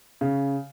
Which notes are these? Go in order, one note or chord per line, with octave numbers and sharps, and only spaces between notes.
C#3